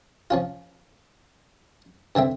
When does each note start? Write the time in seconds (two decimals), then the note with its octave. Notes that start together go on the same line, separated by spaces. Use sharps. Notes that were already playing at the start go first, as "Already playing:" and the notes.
0.30 F3 C#4 F4
2.15 G2 D3 C4 E5